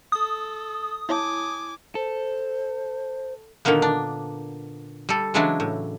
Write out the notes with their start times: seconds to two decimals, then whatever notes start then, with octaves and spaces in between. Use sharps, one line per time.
0.12 A4 D#6
1.09 E4 C#5 G#5 A5 D6
1.95 A4 C5
3.65 A#2 D3 D#3 A#3 B3
3.82 D4
5.09 G3 A4
5.34 C#3 E3 F#3 G#3 D4 E4
5.60 A2